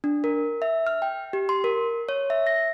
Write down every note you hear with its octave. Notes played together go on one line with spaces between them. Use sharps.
D4
A#4
E5
F6
G5
G4
C6
A#4
C#5
E5
A#6